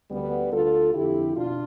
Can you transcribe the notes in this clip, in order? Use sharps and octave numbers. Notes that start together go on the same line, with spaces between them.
D2 D3 G3 B3
D2 D3 F4 A4
F2 D3 E4 G4
B2 D4 F4